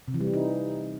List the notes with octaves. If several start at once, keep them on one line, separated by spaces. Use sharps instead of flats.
C3
E3
G3
E3
D#4